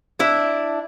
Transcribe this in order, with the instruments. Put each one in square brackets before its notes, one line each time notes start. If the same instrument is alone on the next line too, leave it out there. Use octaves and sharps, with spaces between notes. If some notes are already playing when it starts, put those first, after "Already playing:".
[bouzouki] D4 E4 E5